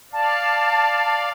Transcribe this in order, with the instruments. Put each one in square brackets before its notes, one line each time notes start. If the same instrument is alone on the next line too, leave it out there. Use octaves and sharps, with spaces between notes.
[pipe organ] D5 F5 [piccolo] A5